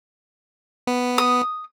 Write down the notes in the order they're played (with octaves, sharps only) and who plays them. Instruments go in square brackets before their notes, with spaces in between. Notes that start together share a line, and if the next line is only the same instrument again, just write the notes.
[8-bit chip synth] B3
[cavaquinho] D#6